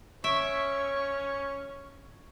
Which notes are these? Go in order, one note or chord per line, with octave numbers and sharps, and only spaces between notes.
C#4 C#5 E5 C#6 D7